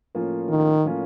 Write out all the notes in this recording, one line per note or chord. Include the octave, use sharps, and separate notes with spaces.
A2 F3 A#3 C#4 F4
D#3
A2 F3 A#3 C#4 F4